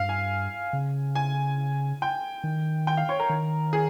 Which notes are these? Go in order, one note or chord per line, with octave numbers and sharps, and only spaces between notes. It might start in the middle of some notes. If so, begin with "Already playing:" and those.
Already playing: G2 F5
G#5
C#3
G#5
G5
D#3
G5
F5
C#5
A#4
D#3
G#4